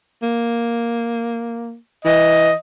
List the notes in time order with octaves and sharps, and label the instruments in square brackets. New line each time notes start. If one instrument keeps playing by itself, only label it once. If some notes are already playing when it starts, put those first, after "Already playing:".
[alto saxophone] A#3
[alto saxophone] E3 [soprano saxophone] D#5